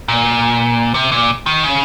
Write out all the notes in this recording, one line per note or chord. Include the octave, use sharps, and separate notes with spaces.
A#2
C3
A#2
D#3
C#3